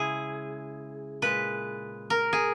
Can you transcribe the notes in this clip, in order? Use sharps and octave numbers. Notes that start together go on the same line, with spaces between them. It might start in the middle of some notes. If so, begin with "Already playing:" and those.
Already playing: C#3 G#3 E4 G#4
A#2 G#3 B4
A#4
G#4